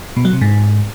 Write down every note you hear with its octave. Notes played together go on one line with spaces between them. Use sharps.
B2
F#3
C3
G#2